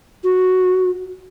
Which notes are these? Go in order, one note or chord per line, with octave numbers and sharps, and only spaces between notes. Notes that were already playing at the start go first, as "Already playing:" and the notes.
F#4